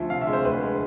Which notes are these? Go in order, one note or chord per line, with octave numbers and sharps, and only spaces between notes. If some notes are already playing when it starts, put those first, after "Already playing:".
Already playing: D2 F3 E5
C3 F5
E5
G#3
C5
D2 B4
G#3